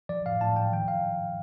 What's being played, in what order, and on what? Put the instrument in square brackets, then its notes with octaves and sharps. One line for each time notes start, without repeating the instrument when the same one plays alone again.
[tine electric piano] F3 D5
A2 F5
A2 A5
F3 G5
D#3 G5
F5